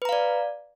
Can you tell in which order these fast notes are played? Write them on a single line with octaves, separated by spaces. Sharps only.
B4 A#5 F5 D5